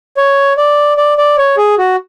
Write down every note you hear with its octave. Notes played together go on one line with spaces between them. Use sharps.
C#5
D5
D5
D5
C#5
G#4
F#4